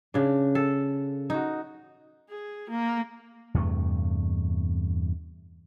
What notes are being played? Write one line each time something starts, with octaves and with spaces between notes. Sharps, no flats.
C#3 D4
A4
D#4 F#4
G#4
A#3
E2 G2 C3 A3